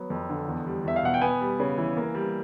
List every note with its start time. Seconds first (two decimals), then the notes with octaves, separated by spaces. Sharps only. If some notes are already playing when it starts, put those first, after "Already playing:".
Already playing: F#3 B3
0.10 F2
0.29 D3
0.48 E2
0.66 G3
0.84 E2 E5
0.96 F5
1.03 B2 F#5
1.14 G5
1.21 B3 G#5
1.41 G3
1.60 C#3
1.78 E3
1.97 A#3
2.15 G3